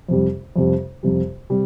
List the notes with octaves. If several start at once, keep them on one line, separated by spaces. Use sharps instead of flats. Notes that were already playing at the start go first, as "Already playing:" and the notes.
F2 C3 G3
F2 C3 G3
F2 C3 G3
C3 G3